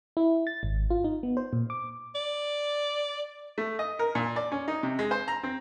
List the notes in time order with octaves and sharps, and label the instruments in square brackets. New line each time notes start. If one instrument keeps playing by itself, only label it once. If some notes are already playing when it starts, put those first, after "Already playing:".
[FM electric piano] E4
A6
G#1
F4
D#4
B3
C5
A#2
D6
[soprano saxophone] D5
[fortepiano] A3
D#5
A#4
A#2
D5
C#4
D#4
C3
G#3
C5
A#5
C4